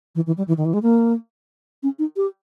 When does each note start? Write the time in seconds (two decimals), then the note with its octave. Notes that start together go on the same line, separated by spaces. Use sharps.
0.15 E3
0.27 E3
0.38 G3
0.48 E3
0.57 D#3
0.65 E3
0.73 G#3
0.82 A#3
1.83 C#4
1.99 D#4
2.17 G4